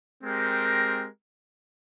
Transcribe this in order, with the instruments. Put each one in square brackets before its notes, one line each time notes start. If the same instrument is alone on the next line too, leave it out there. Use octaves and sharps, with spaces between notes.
[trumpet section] G#3 C4 G4 A#4